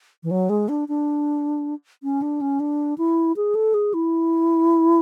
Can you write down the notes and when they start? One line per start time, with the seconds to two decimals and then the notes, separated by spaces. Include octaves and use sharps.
0.23 E3
0.31 F#3
0.49 G#3
0.69 D4
0.88 D4
2.03 C#4
2.22 D4
2.41 C#4
2.60 D4
2.98 E4
3.36 G#4
3.55 A4
3.74 G#4
3.94 E4